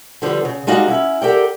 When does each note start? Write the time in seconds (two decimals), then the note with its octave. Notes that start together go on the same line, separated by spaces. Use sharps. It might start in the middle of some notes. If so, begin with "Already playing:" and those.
0.22 D3 F3 G3 B3
0.45 C#3
0.67 G3 G#3 D#4 F#4 D5 F5
0.88 C#4 E4
1.22 G4 A4 A#4 D5 F#5 G5